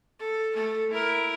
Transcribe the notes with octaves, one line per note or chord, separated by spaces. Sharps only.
A4
A3 A4
E4 A#4